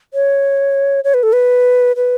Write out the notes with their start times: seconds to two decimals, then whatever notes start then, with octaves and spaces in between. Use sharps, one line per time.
0.14 C#5
1.04 C#5
1.14 B4
1.23 A4
1.33 B4
1.96 B4